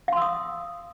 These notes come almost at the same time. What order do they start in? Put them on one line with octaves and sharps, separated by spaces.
F5 C6 E6 D#6